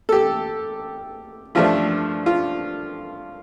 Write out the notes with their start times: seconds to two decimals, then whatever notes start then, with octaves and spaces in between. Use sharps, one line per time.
0.09 A4
0.12 G4
1.55 G2 F3 A3 D4 F4
2.26 F4